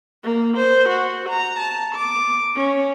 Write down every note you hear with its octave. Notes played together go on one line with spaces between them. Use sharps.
A#3
C5
F#4
A#5
A5
D6
C#4